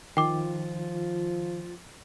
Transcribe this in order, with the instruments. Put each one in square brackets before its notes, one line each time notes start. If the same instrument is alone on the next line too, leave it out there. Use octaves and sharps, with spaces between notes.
[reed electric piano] D#3 [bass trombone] F3 [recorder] F4 [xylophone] G5 D6